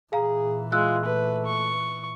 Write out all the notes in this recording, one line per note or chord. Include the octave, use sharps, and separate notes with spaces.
A#2 E3 G#4 F5 A#5
G#3 F4 E6 F#6
A3 B4
C#6